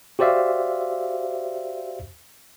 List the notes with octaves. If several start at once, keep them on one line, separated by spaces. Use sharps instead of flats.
F#4 G4 C5 D5 E5 F5